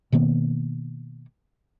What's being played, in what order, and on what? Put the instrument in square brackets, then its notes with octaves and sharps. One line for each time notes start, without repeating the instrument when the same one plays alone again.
[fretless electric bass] B2 D#3 A#3 B3